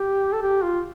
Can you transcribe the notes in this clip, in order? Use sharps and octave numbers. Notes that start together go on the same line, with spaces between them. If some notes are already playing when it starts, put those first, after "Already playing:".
Already playing: G4
A4
G4
F4